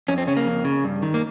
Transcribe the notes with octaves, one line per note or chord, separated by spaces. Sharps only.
F2 C#4
C4
C#3 C#4
A#3
F2
C#3
G2
D#3
A#3